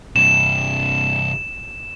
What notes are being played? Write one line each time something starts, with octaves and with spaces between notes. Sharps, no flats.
G2 C3 E7